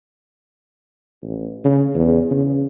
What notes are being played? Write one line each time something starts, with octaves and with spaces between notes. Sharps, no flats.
A1
C#3
E2
C#3